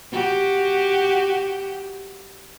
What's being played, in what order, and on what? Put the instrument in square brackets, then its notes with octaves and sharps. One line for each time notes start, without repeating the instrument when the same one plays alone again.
[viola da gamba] F#4 G4